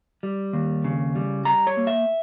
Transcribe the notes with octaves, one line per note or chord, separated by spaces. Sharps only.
G3
D#2
C#3
G3
G3 A#5
C#5
A#3
E5